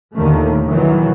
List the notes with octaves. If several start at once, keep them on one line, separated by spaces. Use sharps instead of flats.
D#2 A#2 D3 D#3 A3
B1 D#3 E3 F#3